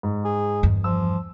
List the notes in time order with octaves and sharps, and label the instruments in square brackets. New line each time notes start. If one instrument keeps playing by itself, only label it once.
[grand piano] G#2
[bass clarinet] G#4
[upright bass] E2 G2
[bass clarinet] F3 [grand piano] E6